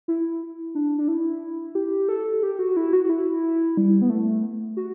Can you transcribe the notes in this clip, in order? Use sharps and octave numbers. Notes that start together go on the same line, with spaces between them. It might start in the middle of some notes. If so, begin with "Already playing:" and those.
E4
D4
D4
E4
G4
A4
G4
F#4
E4
F#4
F#4
E4
G3
B3
A3
F#4